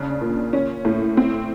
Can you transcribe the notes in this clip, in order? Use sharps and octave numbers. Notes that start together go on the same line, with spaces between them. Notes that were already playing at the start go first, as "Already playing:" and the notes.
Already playing: C#3 D4
A#2
C#4
A2
C4